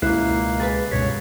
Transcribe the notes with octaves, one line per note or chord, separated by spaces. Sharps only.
C#2 B2 A#3 E4 F#6 C7
G#4 A#4 B4 B5 A6
C#2 G2 B2 C#5 B6